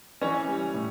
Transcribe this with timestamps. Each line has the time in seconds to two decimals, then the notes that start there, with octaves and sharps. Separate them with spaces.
0.21 E3 C#4 C#5
0.48 G3
0.74 A2